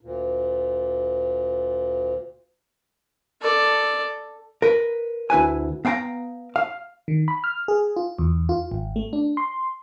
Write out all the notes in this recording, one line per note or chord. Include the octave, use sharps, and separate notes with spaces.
D2 A#2
A4 D5
A#4 B4
D2 E4 B4 G#5
B3 F5 G5 A5 A#5
F5
D#3
B5
F6
G#4
F4
E2
F4
G#1
A3
D4
C6